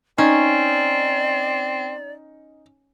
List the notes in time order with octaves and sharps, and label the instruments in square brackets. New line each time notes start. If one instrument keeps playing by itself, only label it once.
[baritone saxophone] C4 [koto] C#4 [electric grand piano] D#4 [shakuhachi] D5